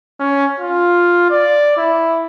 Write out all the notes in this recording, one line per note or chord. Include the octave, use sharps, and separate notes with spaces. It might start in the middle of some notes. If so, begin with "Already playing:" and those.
C#4
F4
D5
E4